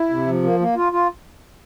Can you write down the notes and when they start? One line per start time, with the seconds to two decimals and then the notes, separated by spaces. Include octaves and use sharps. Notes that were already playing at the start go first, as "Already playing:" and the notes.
Already playing: E4
0.10 C3
0.26 F3
0.43 A#3
0.60 A#3
0.76 F4
0.92 F4